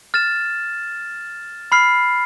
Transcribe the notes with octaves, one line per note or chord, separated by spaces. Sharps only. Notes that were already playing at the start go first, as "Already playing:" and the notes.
F6 A6 E7
B5 F6 C7